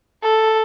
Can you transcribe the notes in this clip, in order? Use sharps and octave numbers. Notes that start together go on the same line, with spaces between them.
A4